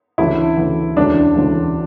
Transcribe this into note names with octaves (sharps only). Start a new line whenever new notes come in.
D2 C#3 E3 E4
D2 C#3 E3
E1 D2 C#3 E3 D4
E1 D2 C#3 E3